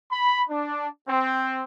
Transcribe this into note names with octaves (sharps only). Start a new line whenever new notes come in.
B5
D4
C4